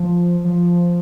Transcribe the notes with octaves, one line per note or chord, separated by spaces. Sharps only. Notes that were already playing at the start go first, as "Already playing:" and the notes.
Already playing: F3
F3